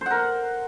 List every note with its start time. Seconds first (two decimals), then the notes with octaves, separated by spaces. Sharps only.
0.01 C5
0.06 F#5
0.11 A#4